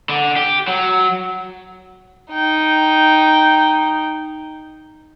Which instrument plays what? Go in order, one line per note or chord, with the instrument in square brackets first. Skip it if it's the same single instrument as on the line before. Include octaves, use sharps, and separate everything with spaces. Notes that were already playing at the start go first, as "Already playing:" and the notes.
[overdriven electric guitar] D3
G4
F#3
[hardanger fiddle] D#4 G5